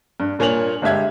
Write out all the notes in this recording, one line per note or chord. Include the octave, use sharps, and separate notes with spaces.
G2
G2 A#2 C#5 G#5 F7 F#7
G1 G#3 G4 E5 G#6